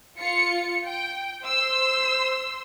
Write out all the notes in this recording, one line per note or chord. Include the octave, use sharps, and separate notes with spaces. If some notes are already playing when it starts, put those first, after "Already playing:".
F4 C#7
G5
C5 C6 E6